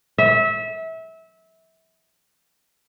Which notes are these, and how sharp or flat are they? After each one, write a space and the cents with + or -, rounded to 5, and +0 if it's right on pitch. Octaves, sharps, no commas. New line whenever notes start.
E5 -25